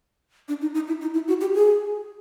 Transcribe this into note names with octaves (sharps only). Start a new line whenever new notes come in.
D4
D#4
D#4
E4
D#4
E4
F#4
G4
G#4